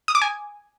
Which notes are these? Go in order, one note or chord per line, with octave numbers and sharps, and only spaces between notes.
D#6
D6
G#5